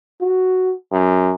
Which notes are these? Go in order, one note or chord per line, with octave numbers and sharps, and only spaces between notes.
F#4
F#2